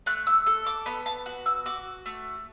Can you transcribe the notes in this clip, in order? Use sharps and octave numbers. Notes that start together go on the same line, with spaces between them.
A3 F#6
E6
A4
D6
B3 B5
A5
F#4
E6
F#4 D6
A3